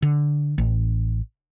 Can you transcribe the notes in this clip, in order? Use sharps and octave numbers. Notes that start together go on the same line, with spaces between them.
D3
A1